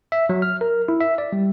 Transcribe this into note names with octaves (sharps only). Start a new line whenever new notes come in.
E5
F#3
F6
A#4
E4
E5
D5
G3